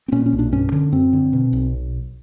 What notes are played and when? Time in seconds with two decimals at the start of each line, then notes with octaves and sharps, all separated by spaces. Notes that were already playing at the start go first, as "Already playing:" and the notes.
0.08 C4
0.12 A#2 C#4
0.26 C#4
0.33 B1
0.39 D4
0.52 G2 C#4
0.72 D3
0.92 F#2 C4
1.13 D3
1.33 B2
1.53 B1